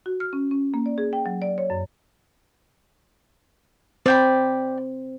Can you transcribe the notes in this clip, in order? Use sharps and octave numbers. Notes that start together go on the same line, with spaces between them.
F#4
F6
C#4
C#4
A#3
D5
G#4
G5
F#3
D5
C#5
F#2
C4 C5 D5 G5 B5